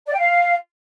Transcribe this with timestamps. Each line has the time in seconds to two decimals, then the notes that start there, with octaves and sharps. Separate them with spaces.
0.07 D5
0.13 G5
0.19 F5